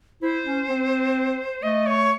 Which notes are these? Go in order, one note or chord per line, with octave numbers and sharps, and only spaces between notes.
E4 C5
C#4
C4
A3 D#5
C#5